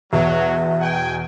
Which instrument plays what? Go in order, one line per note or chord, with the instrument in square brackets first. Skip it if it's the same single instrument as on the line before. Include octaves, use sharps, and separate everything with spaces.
[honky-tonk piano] E2 B2 [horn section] F#3 [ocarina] E5
[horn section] G5 G#5